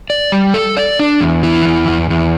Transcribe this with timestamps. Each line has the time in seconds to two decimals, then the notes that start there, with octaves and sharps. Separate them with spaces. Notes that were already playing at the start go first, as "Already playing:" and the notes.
0.10 D5
0.32 G3
0.54 A4
0.77 D5
0.99 D4
1.21 E2
1.43 E3
1.65 E2
1.88 E2
2.10 E2